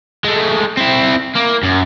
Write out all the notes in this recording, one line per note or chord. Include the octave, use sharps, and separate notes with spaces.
G#3 A3
C4 E4
A#3
F#2